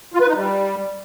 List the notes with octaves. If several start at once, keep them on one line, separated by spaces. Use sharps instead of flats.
F4
B4
D#4
G3